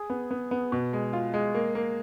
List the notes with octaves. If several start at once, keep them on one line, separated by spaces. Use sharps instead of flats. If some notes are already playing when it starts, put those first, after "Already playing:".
Already playing: G#4
B3
B3
B3
B2
G#3
F4
G#3
A#3
A#3